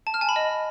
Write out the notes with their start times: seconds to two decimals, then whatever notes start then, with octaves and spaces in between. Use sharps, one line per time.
0.07 A5
0.14 F6
0.21 G#5
0.29 B5
0.36 D#5